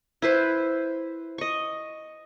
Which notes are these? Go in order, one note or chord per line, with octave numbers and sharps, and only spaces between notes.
E4 B4 C5
D#5 C#6